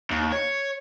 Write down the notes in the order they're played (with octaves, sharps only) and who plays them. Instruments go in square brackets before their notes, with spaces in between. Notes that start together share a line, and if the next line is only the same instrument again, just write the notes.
[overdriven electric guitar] D#2
C#5